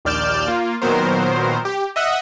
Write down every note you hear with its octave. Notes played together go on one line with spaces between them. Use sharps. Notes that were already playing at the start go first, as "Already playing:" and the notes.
A#1 D#2 D5 F6 G6 E7
A#3 F4
A#2 D#3 F#3 B3 A#4 C5
G4
D#5 E5 F#5